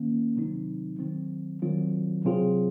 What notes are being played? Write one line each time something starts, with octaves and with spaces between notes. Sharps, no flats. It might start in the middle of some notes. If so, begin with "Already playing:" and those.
Already playing: D#3 A#3 C#4
C3 D#3 F#3 C4 D#4
D#3 F#3 C4
D#3 F#3 C4 F4
C3 F#3 C4 F4 G#4